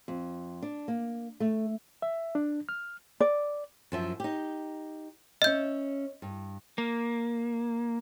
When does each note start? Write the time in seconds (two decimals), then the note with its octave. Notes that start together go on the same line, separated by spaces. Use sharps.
0.08 F2
0.63 D4
0.88 A#3
1.40 A3
2.02 E5
2.35 D4
2.69 F6
3.20 D5
3.92 F#2 F3 E5
4.20 D#4 G4
5.42 C#4 D#5 E5 G6
6.22 G2
6.78 A#3